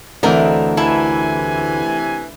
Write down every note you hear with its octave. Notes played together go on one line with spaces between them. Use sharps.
D2 E3 A3 C4 D4 A#4 D#5
C3 E3 E4 G#5 A5